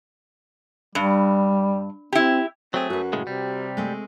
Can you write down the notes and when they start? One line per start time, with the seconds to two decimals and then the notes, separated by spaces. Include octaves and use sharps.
0.95 G2 G3
2.12 C4 E4 G4
2.74 F#3 A3 C4 G#4
2.90 F#2 F#4 B4
3.13 A2 C#3 G#3
3.27 C3 G3
3.77 G#3 A3 C4